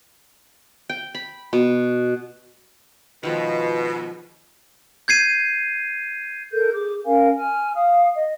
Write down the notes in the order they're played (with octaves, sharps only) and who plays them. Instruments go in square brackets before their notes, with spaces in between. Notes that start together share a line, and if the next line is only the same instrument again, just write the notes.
[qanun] G5
B5
B2
[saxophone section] B2 [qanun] D#3 F3 G#3
[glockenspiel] G6 G#6 C7 D#7
[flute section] A4 A#4 G6
G#4 D6
C#4 A#4 F5 G#5
G#5 F6
F5 D#6
D#5